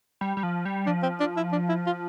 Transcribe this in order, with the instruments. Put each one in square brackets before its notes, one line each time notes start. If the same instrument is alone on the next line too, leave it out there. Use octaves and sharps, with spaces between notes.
[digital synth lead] G3
G3
F3
G3
[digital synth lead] F3 [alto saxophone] D4
[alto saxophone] C4
D4
E4
D4
E4
F4